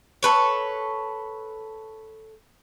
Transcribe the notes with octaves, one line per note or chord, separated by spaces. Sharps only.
A4 B4 C#5